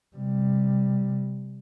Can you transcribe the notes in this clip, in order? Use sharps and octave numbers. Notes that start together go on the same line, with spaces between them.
C3 G3